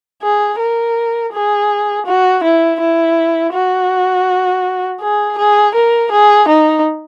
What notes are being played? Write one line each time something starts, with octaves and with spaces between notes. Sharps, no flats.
G#4
A#4
G#4
F#4
E4
E4
F#4
G#4
G#4
A#4
G#4
D#4